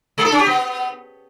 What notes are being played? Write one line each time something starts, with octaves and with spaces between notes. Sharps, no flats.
G#3
A4
C#4
G4
B3